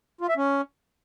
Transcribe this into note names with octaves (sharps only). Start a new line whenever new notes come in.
F4
E5
C#4